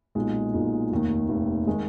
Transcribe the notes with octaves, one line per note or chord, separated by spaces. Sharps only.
B1 A#2 G#3 D#4
B1 A#2 G#3 D#4
F1 D#2 D#3
F1 D#2 D#3
D#3 G#3